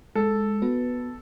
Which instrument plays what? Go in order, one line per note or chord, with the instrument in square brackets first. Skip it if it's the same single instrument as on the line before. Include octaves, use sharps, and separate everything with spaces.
[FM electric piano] G#3 [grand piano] A4
[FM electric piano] B3 F#4 B4